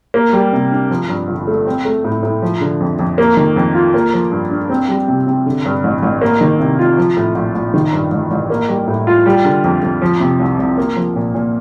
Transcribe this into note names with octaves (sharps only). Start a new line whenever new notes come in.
A#3
G3
C3
D4
F3
G2
G1
A3
C4
A3
A2
A2
F3
D3
F2
F2
A#3
D#3
F2
F4
A#3
F3
G2
D4
C4
G3
C3
C3
D3
G2
A1
A1
A#3
D#3
C3
F4
F3
A2
A#1
A#1
D#3
G2
A1
A1
A#3
G3
A2
F4
G3
D3
F2
F2
F3
C3
C2
C2
A#3
F3
A#2
A#2